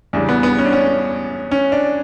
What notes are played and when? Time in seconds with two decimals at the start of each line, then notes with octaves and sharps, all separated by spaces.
0.13 E2 C#3 G3 D4
0.29 B3
0.43 B3
0.58 C#4
0.65 D4
0.73 C#4
1.51 C#4
1.72 D4